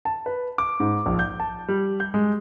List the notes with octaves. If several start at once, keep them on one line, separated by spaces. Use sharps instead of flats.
A5
B4
D6
G#2
A#1
G6
A5
G3
G6
G#3